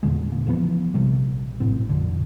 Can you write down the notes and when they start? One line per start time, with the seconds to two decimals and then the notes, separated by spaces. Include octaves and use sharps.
0.03 E2 A#2 D3 G#3
0.32 E1 A#3
0.47 C#3 E3 F3 B3
0.94 A#1 C3 G3
1.60 G#1 F#2 A2 C4
1.89 A#1 F2 B2 D3